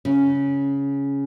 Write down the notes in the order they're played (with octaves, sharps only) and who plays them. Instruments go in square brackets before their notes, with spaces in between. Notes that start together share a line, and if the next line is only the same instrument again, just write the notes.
[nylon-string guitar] C#3